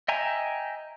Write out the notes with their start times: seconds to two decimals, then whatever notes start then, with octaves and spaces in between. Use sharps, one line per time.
0.08 D#5 E5 G5 G#5 A#5